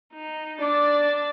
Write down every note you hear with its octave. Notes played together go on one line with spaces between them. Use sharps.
D#4
D4 D5 A5